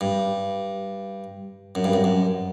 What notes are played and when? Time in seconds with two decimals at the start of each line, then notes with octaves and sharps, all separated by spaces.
0.01 G2
1.75 F#2
1.84 G2
1.93 F#2
2.04 F#2